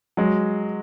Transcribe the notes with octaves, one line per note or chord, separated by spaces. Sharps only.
F#3 G#3